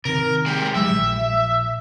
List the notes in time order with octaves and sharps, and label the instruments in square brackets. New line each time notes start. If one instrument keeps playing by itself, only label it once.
[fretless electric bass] C3 D#3 [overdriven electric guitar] A#4
[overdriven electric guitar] G#3 G4
[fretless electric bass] F#3 G#3 [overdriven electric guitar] E5
[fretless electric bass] A#1